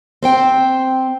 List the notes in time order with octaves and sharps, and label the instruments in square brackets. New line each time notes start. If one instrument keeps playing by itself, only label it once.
[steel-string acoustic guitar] C4 C5 G5